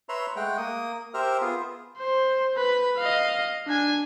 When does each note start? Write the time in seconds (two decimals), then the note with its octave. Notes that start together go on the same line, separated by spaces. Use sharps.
0.09 B4 C#5 E5 A#5 C6
0.36 G#3 A3 F#5 G5
0.57 A#3 D#6
1.14 G4 A#4 C5 E5 F6
1.41 B3 F4 G#4
1.98 C5
2.57 B4
2.97 D#5 F5
3.67 D4 G#5